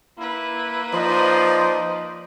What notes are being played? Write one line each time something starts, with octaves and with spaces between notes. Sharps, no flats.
A#3 E4 B4
F3 D#4 C5 D5 D#5